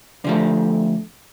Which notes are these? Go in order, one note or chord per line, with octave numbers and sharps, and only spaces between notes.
D3 F3 A3